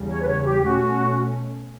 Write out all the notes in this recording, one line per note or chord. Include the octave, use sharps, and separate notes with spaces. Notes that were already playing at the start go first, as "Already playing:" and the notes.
Already playing: E2 C#3 G3
C#5
B4
C#5
G4
B2 A3 C#4 F#4